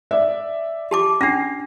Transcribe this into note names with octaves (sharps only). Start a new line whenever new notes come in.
D5 E5
G4 A5 D6
C#4 D4 A#6 C7